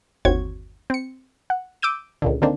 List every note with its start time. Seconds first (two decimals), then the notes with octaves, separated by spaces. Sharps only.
0.25 G1 D#2 C4 F#4 C#5 G#6
0.90 C4 C#7
1.50 F#5
1.82 D6 E6 G6 D#7
2.22 C#2 A#2 D3
2.42 D3 D#3 A#3 C4 D4